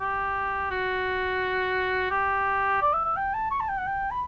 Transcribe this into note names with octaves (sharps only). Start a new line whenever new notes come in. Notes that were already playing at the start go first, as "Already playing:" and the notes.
G4
F#4
G4
D5
E5
E5
G5
A5
C#6
A5
G5
F#5
G5
B5